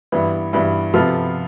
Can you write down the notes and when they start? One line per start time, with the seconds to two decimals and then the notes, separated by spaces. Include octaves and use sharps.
0.12 G2 E3 B3
0.53 G2 E3 B3
0.94 C3 F3 B3 F4 A4